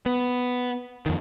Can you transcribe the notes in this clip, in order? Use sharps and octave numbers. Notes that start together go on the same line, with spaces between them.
B3
F2 D#3